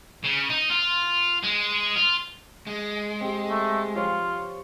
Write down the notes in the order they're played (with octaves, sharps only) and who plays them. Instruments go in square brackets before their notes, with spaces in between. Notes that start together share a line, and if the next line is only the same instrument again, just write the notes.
[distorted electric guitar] C#3
D#4
F4
G#3
F4
[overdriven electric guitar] G#3
[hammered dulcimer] C4 G4
[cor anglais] A3
[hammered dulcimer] F3 C5 C#5 [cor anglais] F4